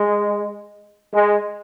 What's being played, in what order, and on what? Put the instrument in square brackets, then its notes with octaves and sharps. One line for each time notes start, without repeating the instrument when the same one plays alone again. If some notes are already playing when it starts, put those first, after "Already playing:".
Already playing: [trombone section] G#3
G#3